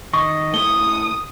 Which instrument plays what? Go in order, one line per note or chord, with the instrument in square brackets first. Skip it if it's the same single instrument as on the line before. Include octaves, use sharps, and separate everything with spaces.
[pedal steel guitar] D#3 D#5 [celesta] C#6
[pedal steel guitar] A3 E4 C#6 [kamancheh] D#6 [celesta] G7